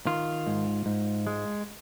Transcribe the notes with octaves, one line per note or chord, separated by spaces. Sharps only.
D#3 F4
G#2
G#2
G#3